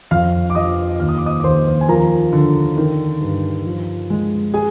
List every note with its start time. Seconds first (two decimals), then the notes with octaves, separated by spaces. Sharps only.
0.11 F2 F5 F6
0.50 D6
0.55 F3 D#5 D#6
1.00 D#2 F6
1.09 D#6
1.18 D6
1.26 D#5 D#6
1.40 D6
1.44 D#2 C5 C6
1.81 G#5
1.88 F3 A#4 A#5
2.33 D3
2.77 D#3
3.21 G2
3.66 F3
4.10 G#3
4.54 G#4 G#5